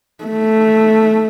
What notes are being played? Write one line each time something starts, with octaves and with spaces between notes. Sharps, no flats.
A3